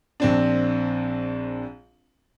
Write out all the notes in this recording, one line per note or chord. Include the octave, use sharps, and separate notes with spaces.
A#1 C4 D4